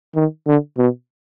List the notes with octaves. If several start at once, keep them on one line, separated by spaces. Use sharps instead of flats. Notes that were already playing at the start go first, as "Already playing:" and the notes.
D#3
D3
B2